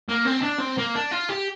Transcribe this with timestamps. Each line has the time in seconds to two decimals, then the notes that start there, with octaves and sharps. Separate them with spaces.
0.09 A#3
0.26 C4
0.43 D4
0.60 C4
0.78 A#3
0.95 D4
1.11 F4
1.29 G4